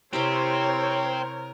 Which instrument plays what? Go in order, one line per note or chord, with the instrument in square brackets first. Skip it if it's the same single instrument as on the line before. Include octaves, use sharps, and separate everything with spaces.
[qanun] C3 E4 G4 [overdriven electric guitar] C4 [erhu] A#4 [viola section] C5 C#5